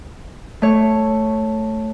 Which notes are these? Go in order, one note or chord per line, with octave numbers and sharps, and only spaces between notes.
A3 C#5